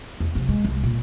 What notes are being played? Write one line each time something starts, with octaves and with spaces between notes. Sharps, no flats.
E2
C3 F3
G#3
C2
A#2